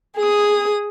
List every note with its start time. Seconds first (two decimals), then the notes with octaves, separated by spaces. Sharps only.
0.17 G#4 D#6